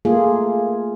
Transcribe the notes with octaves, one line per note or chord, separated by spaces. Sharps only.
A3 A#3 F4 G#4